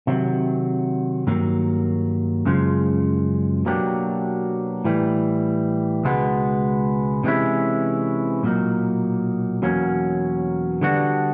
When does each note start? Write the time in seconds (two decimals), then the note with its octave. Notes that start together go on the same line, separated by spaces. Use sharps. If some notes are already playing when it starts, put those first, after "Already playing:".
0.07 C3 D#3 F#3
1.27 G2 D#3 F#3 A#3
2.45 F#2 C#3 F3 G#3
3.65 B2 F#3 A#3 D4 G4
4.85 A2 E3 G3
6.04 C#2 B2 G#3 B3
7.24 C3 E3 G#3 C#4 E4
8.43 B1 A#2 F#3 A#3 D#4
9.62 E2 B2 F#3 A#3 C#4
10.81 D3 G3 B3 D4 F#4